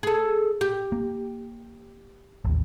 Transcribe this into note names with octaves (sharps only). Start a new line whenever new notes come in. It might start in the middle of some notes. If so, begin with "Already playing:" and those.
G#4 A4
G4
A#3
A1 D#2